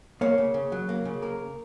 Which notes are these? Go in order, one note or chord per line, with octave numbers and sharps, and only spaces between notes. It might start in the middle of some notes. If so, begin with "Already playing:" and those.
A#3 C#5
C#3
C#3
F#3
A#3
C#3
A#3 A#4